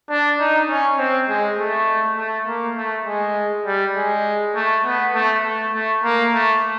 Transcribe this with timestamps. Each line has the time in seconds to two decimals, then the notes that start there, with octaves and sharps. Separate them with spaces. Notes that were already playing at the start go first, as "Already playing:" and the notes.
0.10 D4
0.40 D#4
0.70 C#4
0.99 C4
1.29 G#3
1.59 A3
2.18 A3
2.47 A#3
2.77 A3
3.07 G#3
3.66 G3
3.96 G#3
4.55 A3
4.85 B3
5.14 A3
5.44 A3
5.74 A3
6.04 A#3
6.33 A3